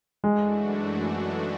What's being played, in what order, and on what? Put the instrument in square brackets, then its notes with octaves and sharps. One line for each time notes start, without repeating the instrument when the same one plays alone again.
[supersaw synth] F#2 E3 A3 D4 F#4 [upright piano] G#3